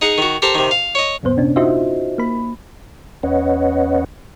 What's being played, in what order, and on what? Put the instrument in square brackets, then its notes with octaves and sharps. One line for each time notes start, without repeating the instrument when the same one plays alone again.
[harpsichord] D#4 G#4 F#5
D#3 F#4
G4 A4 A#4 C5
C3 D#3
F5
C#5 D#5
[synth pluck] C#2 F#2 A#2 B3 C5
C3 C#4 D4
D#4 F4 F#4 C5 D#5 E5
A#3 B5
[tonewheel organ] E2 C#4 B4 C#5 D#5 F#5